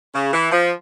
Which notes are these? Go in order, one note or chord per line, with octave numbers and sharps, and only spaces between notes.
C#3
E3
F3